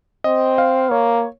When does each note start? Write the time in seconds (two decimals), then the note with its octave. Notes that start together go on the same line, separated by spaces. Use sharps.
0.24 C4 D#5
0.58 F5
0.91 A#3 C#5